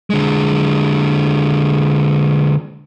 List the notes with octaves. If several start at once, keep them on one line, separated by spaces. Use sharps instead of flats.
D3 G#3